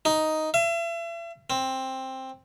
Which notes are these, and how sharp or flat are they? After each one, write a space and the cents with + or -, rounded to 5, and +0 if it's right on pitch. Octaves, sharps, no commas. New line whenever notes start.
D#4 +5
E5 +40
C4 +10